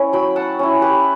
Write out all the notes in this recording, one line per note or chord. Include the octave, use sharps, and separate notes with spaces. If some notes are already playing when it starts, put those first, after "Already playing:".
Already playing: C#4 E4
F#3 G5 B5
F#5 A5
C#4 E4
G4 B4